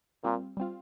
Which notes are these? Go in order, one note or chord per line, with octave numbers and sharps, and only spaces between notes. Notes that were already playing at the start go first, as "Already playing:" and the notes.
A#2 G3 C4 F4
G3 C4 F4